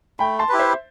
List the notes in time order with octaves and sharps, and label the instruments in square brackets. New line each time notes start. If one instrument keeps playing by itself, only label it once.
[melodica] A3 [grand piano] G5 B5
[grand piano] A5 C6
[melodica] E4 G4 B4
[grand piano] C5 E5